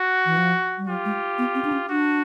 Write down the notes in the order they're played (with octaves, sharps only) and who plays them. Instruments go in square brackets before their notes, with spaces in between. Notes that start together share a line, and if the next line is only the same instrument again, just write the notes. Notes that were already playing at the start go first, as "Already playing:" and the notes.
Already playing: [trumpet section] F#4
[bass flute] E3
F3
G3
[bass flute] F#3 [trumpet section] F4 G4
[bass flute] G#3
B3
C4
D4
C#4
[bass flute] D4 [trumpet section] F#4